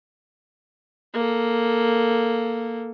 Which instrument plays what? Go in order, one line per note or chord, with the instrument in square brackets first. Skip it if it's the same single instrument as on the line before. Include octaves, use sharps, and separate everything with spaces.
[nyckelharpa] A#3 A4